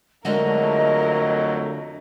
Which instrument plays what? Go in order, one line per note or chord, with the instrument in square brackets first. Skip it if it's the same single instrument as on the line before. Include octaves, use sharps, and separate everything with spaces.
[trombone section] F2 F#3 A3 [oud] D3 G#3 F#4 [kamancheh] A#4 [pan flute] D#5